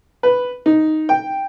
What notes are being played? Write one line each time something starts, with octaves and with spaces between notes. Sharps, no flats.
B4
D#4
G5